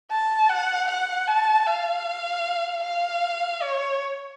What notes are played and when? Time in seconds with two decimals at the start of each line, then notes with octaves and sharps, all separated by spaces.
0.11 A5
0.49 F#5
0.89 F#5
1.27 A5
1.67 F5
2.84 F5
3.62 C#5